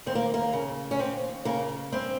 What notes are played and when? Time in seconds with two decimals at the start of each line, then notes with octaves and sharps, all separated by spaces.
0.06 D#2 C4
0.15 A#3
0.34 A#3
0.53 C#3
0.91 C#4
0.99 D#2 C4
1.45 C#3 A#3
1.92 G2 C4